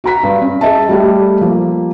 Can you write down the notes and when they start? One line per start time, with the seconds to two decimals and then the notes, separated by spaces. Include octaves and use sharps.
0.04 F#4 A#5 B6
0.23 G2
0.42 C#4
0.61 G#4 D#5 E5 A5
0.89 G3 A3 G4
1.41 F3 A#3